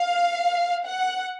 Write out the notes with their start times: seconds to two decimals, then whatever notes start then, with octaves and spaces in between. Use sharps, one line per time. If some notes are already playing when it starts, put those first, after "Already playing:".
Already playing: F5
0.86 F#5